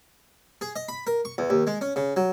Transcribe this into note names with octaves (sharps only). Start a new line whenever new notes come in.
G#4
D#5
B5
A#4
C#6
E2
D#2
G#3
C#4
C#3
F#3